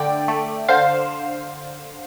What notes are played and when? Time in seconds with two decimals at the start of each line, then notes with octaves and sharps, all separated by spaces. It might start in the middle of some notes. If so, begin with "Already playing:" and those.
Already playing: D3 A3 D5 G5
0.28 A3
0.69 D3 C5 F5